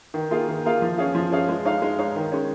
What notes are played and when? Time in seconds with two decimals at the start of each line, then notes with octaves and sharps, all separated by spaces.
0.14 D#3
0.31 A#3 F4 G#4 F5
0.49 D#3
0.65 A#3 F4 G#4 F5
0.82 F3
0.98 C#4 G#4 F5
1.15 F3
1.32 C#4 G#4 F5
1.49 G#3
1.65 D#4 C#5 F5
1.82 G#3
1.98 D#4 C#5 F5
2.16 D#3
2.32 G#3 C#4